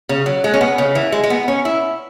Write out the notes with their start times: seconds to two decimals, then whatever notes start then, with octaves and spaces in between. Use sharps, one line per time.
0.09 C#3
0.26 F#3
0.44 G#3
0.54 C#4
0.61 B3
0.78 C#3
0.95 E3
1.12 G#3
1.24 G#3
1.30 B3
1.48 C#4
1.65 E4